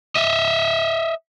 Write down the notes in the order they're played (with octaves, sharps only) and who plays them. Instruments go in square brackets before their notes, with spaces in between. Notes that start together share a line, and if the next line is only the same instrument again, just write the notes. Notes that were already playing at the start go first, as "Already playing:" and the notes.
[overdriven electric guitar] D#5 E5